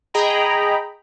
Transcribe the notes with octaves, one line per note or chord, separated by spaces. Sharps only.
G#4 D#5 G5 A#5 B5